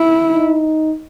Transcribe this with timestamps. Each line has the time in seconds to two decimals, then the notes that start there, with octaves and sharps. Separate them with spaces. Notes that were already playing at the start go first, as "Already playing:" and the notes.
Already playing: E4
0.33 D#4